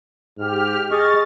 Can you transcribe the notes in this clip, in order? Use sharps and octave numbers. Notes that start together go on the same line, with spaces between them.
G#2 G4 F6
G#4 D#5 C#6 F6 A6